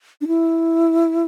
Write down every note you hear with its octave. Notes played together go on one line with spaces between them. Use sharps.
D4
E4